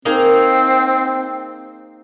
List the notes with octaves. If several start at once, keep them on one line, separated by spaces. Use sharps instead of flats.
A#3 C4 D#4 G#4